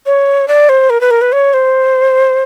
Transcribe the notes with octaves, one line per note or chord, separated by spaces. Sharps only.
C#5
D5
C5
A#4
B4
A#4
B4
C#5
C5